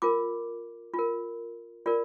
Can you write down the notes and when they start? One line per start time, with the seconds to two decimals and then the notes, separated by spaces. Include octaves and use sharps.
0.02 F4 A#4 D6
0.94 F4 A#4
1.86 F4 A#4 D5